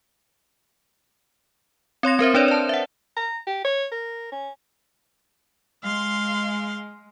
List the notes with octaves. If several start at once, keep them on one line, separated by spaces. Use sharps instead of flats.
C4 C#5 C6 A#6
C4 A#4 C5 E5
C4 D4 B4 C#5 D5
D5 A5
E5 F#5
A#5
G4
C#5
A#4
C#4
G#3 F5 C6